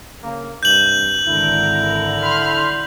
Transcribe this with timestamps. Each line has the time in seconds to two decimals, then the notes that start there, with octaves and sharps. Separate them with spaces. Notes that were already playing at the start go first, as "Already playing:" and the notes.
0.22 C#3 A#3
0.63 G2 C3 G6 F#7
1.26 G#1 D3 E4 A#4
2.21 B5 C6 F6